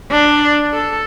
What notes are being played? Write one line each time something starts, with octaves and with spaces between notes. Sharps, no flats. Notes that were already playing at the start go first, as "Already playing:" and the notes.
D4
A4